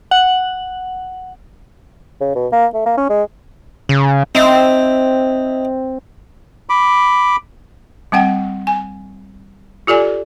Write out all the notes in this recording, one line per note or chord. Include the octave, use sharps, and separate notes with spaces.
F#5
C#3
B2
A#3
A3
A#3
C#4
G#3
C#3
C4 D#4 E4
B5 D6
G3 C4 F#5 G5
G#5
F4 G4 A4 D5 G#5